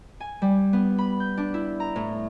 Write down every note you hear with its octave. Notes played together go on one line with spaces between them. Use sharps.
G#5
G3
B3
B5
G6
D4
E4
A#5
A2